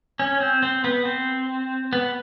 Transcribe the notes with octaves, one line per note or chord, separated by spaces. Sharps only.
C#4
C4
C4
B3
C4
B3